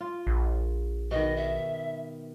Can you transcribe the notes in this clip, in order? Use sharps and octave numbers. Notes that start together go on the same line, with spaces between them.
F4
A#1
B2 D#3 D#5
E5